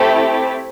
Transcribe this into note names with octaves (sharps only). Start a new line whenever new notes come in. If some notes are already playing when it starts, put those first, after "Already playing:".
Already playing: A3 C4 E4 G4